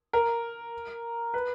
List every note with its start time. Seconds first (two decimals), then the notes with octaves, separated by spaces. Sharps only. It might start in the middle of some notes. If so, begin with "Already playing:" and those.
0.13 A#4
1.34 B4